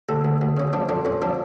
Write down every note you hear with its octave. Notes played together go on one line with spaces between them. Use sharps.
D2 A4
D2
D2
C#3 C#4
F3 D4
F2 D4
F2 C#4
F3 D4